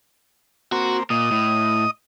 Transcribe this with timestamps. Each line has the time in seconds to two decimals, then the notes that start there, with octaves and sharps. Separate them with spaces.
0.72 A#3 C4 F#4
1.10 A#2 D#5 D#6
1.31 A2